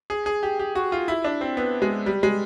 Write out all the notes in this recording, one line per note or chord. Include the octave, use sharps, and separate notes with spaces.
G#4
G#4
G4
G4
F#4
F4
E4
D4
C4
B3
G#3
G3
G#3